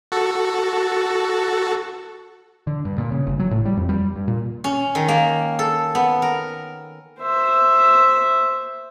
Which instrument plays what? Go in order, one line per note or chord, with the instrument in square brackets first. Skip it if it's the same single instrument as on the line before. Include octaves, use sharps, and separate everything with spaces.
[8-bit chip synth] F#4 A4
[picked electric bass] D3
G2
A#2
C#3
G1
F#3
A2
G3
F2
G3
G2
A#2
[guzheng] C#4
D#3
A#3
A4
B3
A#4
[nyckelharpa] C5 E5